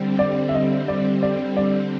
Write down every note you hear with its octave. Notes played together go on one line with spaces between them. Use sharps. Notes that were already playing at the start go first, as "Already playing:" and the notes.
Already playing: D3 G3 C4
D5
E5
D#5
D5
D5
D5